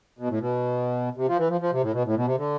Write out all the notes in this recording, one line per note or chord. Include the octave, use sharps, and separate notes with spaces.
B2
A2
B2
C3
F3
E3
F3
F3
C3
A2
B2
A2
B2
C3
D3